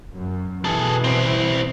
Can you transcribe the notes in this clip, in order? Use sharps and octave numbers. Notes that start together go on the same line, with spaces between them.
F#2
B2 E3 G#4 A4
C4 E4